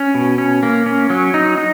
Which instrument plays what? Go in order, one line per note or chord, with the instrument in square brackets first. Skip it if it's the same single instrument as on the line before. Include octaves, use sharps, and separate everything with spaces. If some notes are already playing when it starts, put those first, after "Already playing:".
Already playing: [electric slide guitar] C#4
B2
C#4
A#3
C#4
F#3
D#4
D#4